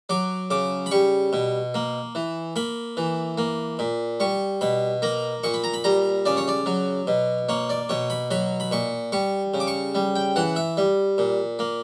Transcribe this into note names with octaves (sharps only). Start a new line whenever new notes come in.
F#3 D6
C#3 D6
B5
G3 C#6
B2
A#3
E3
A#3 B5
E3
A#3
A#2
G3 C#6
B2 B5
A#3 A#5
A#2 C#6
B5
A#5
B5
G3 A#5
C#3 D5
C#5
D5
F#3
B2
A#3 C#5
D5
B2 C#5
B5
F#3 B5
B5
A#2 C#6
G3 C#6
C#3
D6
C#6
G3
G5
E3 F#5
E5
G3
A#2
A#3